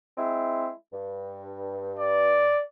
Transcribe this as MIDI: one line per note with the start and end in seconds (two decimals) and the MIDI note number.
0.18 0.69 56
0.18 0.69 60
0.18 0.69 64
0.93 2.52 43
1.99 2.63 74